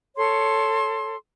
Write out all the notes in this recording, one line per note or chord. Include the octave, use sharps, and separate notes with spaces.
A4 C#5 C6